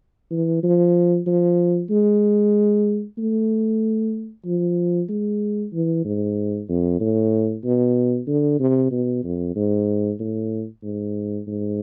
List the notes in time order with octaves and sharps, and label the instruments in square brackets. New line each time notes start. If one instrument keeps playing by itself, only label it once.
[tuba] E3
F3
F3
G#3
A3
F3
G#3
E3
G#2
F2
A2
B2
D3
C3
B2
F2
G#2
A2
G#2
G#2